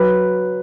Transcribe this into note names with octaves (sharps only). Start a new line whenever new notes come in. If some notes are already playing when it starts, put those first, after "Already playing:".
Already playing: F#3 B4